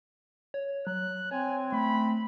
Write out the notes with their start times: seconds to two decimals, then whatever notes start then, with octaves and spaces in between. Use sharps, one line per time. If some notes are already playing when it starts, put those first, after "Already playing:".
0.54 C#5
0.87 F#3 F#6
1.31 C4 C#5 G#5
1.72 A3 B5